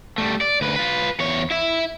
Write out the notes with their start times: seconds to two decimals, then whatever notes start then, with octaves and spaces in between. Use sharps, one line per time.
0.18 G3 A3
0.41 D5
0.61 D2 B4
0.76 F4 B4
1.20 E2 C#5
1.51 E4 E5